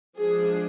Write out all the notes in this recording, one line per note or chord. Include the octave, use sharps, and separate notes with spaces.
F3 G#3 D4 G#4